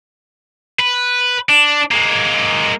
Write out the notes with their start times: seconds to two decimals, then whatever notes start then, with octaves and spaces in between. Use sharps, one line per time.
0.79 B4
1.49 D4
1.91 G#3 A#3